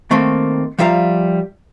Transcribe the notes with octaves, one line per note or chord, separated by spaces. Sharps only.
D#3 A3 A#3 C4
F3 G3 E5 F5 A#5